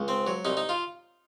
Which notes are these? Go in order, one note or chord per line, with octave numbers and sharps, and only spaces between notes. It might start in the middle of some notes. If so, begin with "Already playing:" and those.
Already playing: C#2
C4
F#3
C2 D#4
D#4
F4